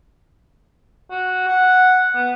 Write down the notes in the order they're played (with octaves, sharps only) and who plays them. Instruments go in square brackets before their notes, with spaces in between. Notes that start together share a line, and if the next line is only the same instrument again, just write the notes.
[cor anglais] F#4
F#5
B3